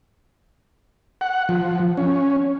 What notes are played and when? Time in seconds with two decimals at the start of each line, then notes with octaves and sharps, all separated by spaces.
1.21 F#5
1.49 F3
1.97 C#4